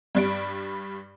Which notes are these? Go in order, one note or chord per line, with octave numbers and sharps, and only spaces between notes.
G2 G3 D7